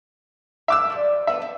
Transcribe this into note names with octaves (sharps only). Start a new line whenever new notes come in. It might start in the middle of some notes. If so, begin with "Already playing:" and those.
A#4 E5 D6 E6
F3 G3
A3 B3 B4 E5
C4 A4